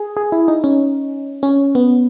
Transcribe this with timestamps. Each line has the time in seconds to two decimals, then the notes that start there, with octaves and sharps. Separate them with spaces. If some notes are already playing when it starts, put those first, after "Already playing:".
Already playing: G#4
0.17 G#4
0.32 E4
0.48 D#4
0.64 C#4
1.43 C#4
1.75 B3